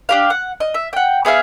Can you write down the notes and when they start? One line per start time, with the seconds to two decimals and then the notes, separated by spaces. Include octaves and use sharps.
0.09 D4 G4 F5
0.30 F#5
0.60 D#5
0.74 E5
0.93 F#5 G5
1.25 B3 G#4 E5 F5